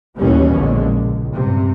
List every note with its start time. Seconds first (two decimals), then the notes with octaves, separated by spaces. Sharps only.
0.19 A1 D#2 B2 E3 G3 C#4
0.54 A#1 E2 D3 G#3
0.94 C#2
1.35 G2 C3